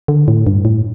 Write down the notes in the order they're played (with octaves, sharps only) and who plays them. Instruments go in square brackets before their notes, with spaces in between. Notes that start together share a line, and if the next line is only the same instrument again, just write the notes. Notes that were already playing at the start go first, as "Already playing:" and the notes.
[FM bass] D3
A2
G2
A2